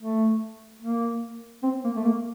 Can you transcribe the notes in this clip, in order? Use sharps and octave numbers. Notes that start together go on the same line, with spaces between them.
A3
A#3
C4
A#3
A3
A#3